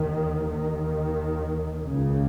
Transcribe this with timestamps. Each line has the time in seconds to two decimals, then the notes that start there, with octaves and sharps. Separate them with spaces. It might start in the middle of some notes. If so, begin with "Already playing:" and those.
Already playing: D#2 D#3
0.51 D#2 D#3
1.83 C#2 C#3